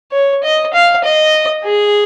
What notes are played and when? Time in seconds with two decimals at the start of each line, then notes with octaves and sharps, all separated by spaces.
0.12 C#5
0.44 D#5
0.74 F5
1.04 D#5
1.66 G#4